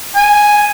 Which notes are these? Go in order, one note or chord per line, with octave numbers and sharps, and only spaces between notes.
G#5